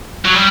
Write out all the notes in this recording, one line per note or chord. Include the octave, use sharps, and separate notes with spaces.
F#3
G3